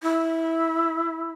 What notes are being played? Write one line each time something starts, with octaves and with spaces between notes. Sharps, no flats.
E4